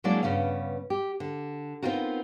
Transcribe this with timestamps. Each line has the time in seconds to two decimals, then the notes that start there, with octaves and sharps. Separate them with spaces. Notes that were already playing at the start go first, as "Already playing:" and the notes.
0.04 F#3 G#3 A#3 D4 E4 D5
0.23 G2 C#3 B3 F5
0.90 G4
1.20 D3
1.82 B3 C4 D#4 F4 F#4 A#4